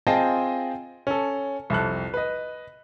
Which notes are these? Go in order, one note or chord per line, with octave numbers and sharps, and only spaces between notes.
C4 F4 G#4 D#5 G5 A5
C#4 A4
C2 F2 A4 F#6
B4 D#5